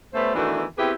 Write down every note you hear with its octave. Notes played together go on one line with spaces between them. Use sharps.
G3 A3 B3 C#4 C5
D#3 E3 A3 B3 D4 F#4
B3 C4 E4 G4 G#4 B4